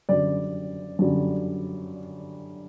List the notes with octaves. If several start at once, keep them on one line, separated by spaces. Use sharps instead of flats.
F#2 D3 G3 D5
F#2 D3 G3